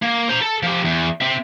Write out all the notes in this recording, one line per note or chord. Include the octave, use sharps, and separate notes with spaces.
A#3
C5 A#5
A4
F3 G4
E2
C4 E5